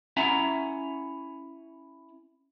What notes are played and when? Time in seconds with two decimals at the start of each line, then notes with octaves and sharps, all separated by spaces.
0.17 C#4 E4 E5 F#5 G#5 A#5